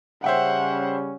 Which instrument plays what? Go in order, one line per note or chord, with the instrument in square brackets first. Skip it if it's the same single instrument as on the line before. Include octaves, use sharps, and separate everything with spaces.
[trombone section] C#3 G3 C#4 [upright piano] C5 E5 G5 [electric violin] F#5